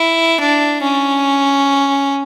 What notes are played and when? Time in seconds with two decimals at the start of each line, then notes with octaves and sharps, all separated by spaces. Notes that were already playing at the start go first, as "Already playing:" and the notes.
Already playing: E4
0.40 D4
0.82 C#4